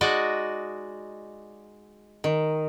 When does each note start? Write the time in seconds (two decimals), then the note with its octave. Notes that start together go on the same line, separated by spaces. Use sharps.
0.01 G#3 D#4 F#4 D5 D#5
2.24 D#3